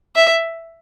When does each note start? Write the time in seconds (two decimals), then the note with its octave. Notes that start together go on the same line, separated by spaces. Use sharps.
0.16 E5